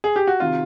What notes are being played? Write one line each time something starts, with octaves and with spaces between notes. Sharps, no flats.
G#4
G4
F#4
C3 D#3 F4